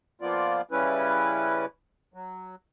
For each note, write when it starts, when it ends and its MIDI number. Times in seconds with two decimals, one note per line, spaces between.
0.21 0.61 53
0.21 0.61 58
0.21 0.61 59
0.21 0.61 65
0.21 0.61 74
0.71 1.66 49
0.71 1.66 55
0.71 1.66 61
0.71 1.66 64
0.71 1.66 71
2.14 2.55 54